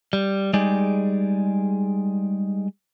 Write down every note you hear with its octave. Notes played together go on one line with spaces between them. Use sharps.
G3
G3 G#3 D#4 G#4 D5